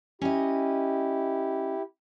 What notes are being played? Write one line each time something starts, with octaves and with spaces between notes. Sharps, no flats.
C#4 E4 G4 D#5